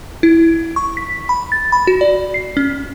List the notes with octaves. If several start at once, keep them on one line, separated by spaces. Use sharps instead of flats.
E4
C#6
B6
B5
A6
B5
F#4
D5
C7
C#4